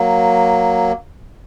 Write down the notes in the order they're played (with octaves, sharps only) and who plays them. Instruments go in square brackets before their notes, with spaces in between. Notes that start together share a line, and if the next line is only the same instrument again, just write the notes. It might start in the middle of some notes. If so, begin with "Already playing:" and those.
Already playing: [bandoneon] F#3 A#3